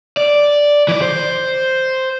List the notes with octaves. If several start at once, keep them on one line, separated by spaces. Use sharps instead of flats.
D5
E3 D5
C5